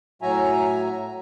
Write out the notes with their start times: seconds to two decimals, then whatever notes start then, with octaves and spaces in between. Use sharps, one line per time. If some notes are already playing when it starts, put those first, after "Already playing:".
0.22 A2 F#3 F#4 E5 G#5 A#5